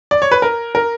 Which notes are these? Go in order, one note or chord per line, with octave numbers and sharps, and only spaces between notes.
D5
C#5
B4
A#4
A#4